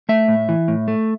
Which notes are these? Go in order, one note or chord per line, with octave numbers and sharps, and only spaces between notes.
A3 E5
A2
E3
A2
A3